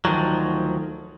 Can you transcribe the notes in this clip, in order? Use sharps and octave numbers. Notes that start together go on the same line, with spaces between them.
D2 D#3 F3 F#3